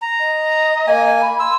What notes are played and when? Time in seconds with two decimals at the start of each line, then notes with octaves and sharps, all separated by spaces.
0.02 A#5
0.20 D#5
0.87 A#3 G#5
1.22 B5
1.40 C6 E6